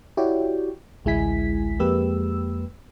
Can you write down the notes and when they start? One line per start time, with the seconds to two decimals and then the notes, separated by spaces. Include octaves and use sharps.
0.17 E4 F#4 G4 C#5 D5 G5
1.05 A1 D2 G#3 E4 G#5 B6
1.79 F2 G#3 A#3 G4 B4 E6